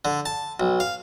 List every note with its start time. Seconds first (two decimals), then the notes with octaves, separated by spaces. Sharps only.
0.05 D3
0.26 A5
0.60 B1
0.80 F5